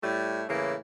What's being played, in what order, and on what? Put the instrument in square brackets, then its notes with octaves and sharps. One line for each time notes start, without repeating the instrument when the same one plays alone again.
[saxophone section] A2 G3 A3
A2 C#3 E3 A#3